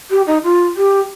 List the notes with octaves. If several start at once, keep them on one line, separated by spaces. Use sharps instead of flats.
G4
D#4
F4
G4